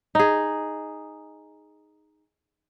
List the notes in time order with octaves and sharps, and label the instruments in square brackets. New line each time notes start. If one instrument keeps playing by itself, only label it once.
[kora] D#4 G#4